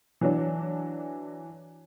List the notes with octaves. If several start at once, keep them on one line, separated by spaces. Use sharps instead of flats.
E3 F#3 D4